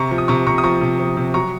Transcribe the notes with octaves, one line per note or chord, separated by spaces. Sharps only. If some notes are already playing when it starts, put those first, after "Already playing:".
Already playing: C3 A#5 C#6
F3
D#6
C3 A#5 C#6
C3 A#5 C#6
D#6
F3 A#5 C#6
C3
F3
C3
F#3 A#5 C#6